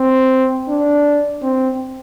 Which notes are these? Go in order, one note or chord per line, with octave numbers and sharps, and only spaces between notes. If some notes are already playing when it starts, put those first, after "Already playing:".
Already playing: C4
D4
C4